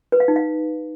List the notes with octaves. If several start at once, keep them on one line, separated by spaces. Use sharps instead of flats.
B4
F5
D#4
F5